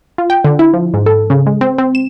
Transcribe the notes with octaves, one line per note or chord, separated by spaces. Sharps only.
F4
G5
D3
E4
F3
G#2
A4
C#3
G#3
C4
C4
E7